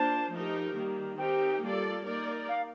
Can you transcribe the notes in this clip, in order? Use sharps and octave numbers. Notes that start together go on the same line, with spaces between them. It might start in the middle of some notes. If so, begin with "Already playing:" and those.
Already playing: A#3 D4 F4 C5 A5
F3 A3 D#4 G4 A#4
D#3 G3 A#3
C4 D#4 G4 A#4 G5
G3 A#3 F4 A4 D5
A#3 D#4 A#4 D5
F5